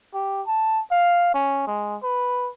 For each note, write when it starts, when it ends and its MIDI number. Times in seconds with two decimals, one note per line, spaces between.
0.14 0.42 67
0.47 0.81 81
0.92 1.30 77
1.34 1.64 61
1.67 1.97 56
2.03 2.50 71